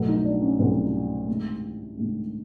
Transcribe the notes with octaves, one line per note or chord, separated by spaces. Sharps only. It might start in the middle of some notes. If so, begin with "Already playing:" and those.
Already playing: C2 B2 F#3 A3
D#4
D4
C#4
C2 B2 F#3 A3 C4
D2 C3 D#3 G#3
D2 C3 D#3 G#3